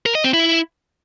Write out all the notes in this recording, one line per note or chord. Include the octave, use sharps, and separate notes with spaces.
A#4
D#5
C4
E4